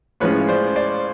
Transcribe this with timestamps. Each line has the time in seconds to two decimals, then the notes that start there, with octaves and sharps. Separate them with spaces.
0.20 A2 F3 G#3 C#4 B4 C#5
0.49 C5 D5
0.76 C5 D5